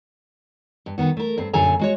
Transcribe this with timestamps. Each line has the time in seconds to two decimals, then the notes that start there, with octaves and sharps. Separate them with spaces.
0.86 G2
0.98 D#3 B3 F#4
1.17 A3 A#4
1.38 G2 C4
1.53 F#2 A#2 D3 A4 G#5 A#5
1.79 G#3 F#4 C#5